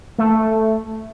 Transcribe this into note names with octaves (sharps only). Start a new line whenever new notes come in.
A3